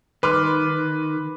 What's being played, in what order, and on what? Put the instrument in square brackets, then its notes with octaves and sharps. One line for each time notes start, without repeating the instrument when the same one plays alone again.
[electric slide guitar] D#3 [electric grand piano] B4 [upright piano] C6 D6 F6